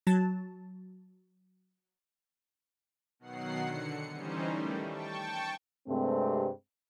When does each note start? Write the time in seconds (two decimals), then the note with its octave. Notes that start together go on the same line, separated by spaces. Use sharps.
0.07 F#3 A5
3.19 B2 D#3 F#3 F#5 C7
3.61 D3 C#7
4.12 E3 G3 C#4 D#4 C5
4.48 D#3 G3 A3
4.87 G5 A5 C#6
5.87 G2 C3 G#3 A3 C4